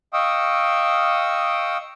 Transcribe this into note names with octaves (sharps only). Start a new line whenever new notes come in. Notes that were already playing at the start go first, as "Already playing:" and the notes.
D#5 F5 G5 C#6 D#6 E6